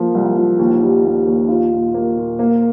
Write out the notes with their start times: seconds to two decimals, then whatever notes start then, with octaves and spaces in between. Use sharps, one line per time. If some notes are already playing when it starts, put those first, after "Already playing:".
Already playing: F3 A#3
0.14 C2
0.36 F3
0.59 D#2
0.82 G3
1.04 D#2
1.26 D#2
1.48 F4
1.71 A#2
1.94 A#3
2.16 A#2
2.39 A#3